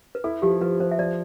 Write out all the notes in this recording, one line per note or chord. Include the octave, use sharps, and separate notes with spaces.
B4
E4 A4
F3 G4
F3 B4
F3 C5
E5
F3 D5